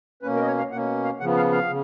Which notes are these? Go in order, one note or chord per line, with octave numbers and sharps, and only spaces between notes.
B2 A#3 C#4 B4
A#4
D#5
C#5
F5
B2 A#3 C#4 F#5
F5
C#3 F3 B3 F#5
F5
F5
C#3